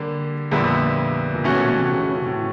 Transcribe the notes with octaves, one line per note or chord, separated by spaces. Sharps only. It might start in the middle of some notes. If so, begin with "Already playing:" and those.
Already playing: D3 G3 A#3
F2 A#2 D3 G3 B3 E4
A#2
B2 E3 A3 C#4 F#4
A#2
B2
C3
C#3
C#3
C3
A2